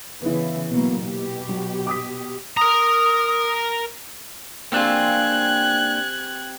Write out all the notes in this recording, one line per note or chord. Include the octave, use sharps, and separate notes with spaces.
C#3 E3 B3 E4
B2 F#3 A#3
B2 G4
F#3
D6 D#6 B6
A#4 A#5 D#6
A#3 C4 D4 F4 G4 G#5 F#6 G#6